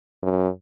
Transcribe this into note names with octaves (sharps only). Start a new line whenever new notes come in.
F#2